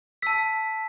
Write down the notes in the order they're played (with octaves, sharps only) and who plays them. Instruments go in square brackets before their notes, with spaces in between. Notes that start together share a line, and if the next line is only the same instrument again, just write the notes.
[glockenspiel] A5 E6 B6